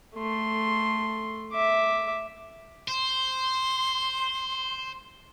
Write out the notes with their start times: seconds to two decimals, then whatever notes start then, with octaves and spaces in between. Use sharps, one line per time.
0.15 A3 C6
1.53 E5 D6
2.88 C5 C6